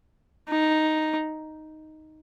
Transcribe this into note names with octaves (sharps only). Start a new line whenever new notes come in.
D#4